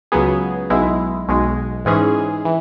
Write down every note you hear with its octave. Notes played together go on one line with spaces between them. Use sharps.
C#2 C#3 F#3 B3 G#4
B1 B2 G#3 E4
B1 B2 G#3
G#2 E3 G#3 C#4 G#4
E3